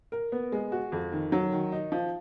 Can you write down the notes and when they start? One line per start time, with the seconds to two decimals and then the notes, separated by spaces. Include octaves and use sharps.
0.12 A#4
0.32 B3
0.52 G#3
0.72 F#4
0.92 F2
1.12 D#3
1.32 F#3
1.52 D#3
1.72 D#4
1.92 F3